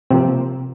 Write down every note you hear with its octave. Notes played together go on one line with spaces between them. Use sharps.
C3 F3 A#3 C4